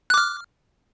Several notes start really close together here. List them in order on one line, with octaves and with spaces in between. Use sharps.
F#6 D6 F6